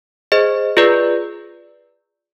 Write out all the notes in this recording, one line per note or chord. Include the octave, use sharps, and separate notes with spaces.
G#4 C5 D#5
F4 G#4 B4 D5